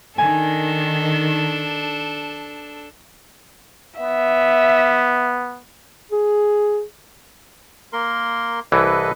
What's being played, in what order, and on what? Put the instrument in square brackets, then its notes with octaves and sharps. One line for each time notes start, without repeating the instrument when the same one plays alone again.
[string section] D#3 [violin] D4 A4 [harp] G#5
[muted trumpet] B3 [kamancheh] E5
[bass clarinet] G#4
[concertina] A#3 A#4 C6
[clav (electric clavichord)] C2 E3 [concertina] A4 B4 D#5